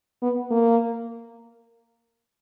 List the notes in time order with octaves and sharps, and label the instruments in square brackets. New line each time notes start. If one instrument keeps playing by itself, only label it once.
[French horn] B3
A#3